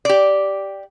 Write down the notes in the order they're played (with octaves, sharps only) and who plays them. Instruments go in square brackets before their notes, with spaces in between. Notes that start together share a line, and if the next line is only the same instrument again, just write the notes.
[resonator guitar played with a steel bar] G4 D5